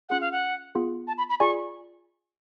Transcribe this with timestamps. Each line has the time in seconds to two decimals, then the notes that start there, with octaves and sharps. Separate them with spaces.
0.09 C#4 F4 G#4 F#5
0.21 F5
0.32 F#5
0.75 B3 F4 G#4
1.07 A5
1.18 B5
1.30 B5
1.40 F4 G#4 D5 G#5 C#6